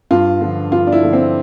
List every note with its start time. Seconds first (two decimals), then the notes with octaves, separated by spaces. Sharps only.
0.11 G2 F4
0.41 D3 F3
0.72 G2 F4
0.87 D4
0.92 E4
1.03 D3 F3
1.13 C4